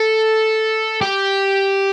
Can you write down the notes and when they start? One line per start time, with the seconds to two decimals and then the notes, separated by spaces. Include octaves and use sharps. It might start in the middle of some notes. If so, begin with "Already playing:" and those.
Already playing: A4
1.01 G4